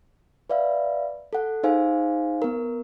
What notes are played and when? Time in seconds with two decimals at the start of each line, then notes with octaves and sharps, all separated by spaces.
0.50 B4 D5 E5 F5
1.33 A4 F#5
1.63 D#4 G#4 C5 F5 G#5
2.42 B3 A#4